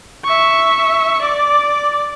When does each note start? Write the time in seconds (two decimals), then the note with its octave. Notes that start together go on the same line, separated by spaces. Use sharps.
0.24 E5 C#6
1.22 D5 D6